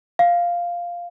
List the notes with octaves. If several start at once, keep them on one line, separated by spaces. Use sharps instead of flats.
F5